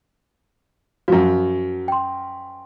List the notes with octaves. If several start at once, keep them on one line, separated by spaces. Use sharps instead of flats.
F#2 F3 F#4
G5 C6